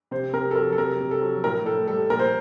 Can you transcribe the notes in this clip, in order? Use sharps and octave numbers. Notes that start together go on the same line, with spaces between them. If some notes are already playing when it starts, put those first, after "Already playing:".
C3 C5
C3 A#4
A4
F#3 A#4
A4
C3 A#4
C3
A4
F#3
A2 A#4
A2 A4
G3 A4
A#2 A#4
C5